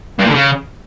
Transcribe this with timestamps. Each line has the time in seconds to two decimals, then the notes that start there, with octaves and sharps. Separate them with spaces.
0.19 G2
0.24 A#2
0.29 D3
0.34 C#3